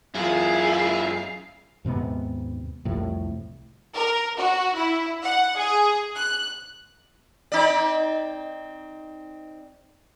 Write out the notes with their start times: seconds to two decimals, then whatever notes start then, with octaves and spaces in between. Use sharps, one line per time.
0.15 F#2 E4 F4 G#4 F5
1.85 D#2 G#2 C3 B3
2.85 C2 F2 A2
3.94 A#4
4.38 F#4
4.76 E4
5.23 F#5
5.58 G#4
6.15 F#6
7.52 C4 D#4 D5